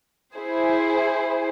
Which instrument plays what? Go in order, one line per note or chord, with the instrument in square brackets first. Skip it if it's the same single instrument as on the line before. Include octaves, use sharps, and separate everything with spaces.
[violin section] E4 G#4 C5